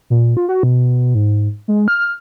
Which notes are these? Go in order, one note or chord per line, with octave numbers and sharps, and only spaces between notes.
A#2
F4
F#4
B2
G#2
G#3
F6